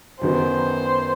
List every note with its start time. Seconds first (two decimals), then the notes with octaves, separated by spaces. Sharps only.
0.21 F#2 D#3 F#3 B3 C5